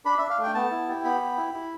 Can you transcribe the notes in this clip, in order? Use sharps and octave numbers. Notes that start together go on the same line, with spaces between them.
D4 B5
E5
D4
F5
A3 G5
B3 A5
E4
G4
B3 B5
G4
E4
E4